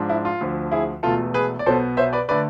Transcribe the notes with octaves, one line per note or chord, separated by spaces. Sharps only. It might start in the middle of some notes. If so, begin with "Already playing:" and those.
Already playing: G#2 F3 G#3 D4
E4
F4
D2 D3 F3
E4 G#4
E1 E2 B2 A3 F4 A4
G#4 B4
D5
B1 B2 B3 A4 C5
C5 E5
B4 D5
D3 A3 B4 D5